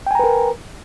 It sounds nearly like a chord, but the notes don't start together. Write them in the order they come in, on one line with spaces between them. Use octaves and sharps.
G5 G#5 A#5 B4 A#4